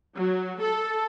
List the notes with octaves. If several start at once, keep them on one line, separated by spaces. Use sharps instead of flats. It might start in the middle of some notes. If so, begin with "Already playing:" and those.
F#3
A4